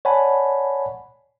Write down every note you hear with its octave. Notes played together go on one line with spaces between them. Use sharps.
C#5 D5 F#5 G#5 A5 B5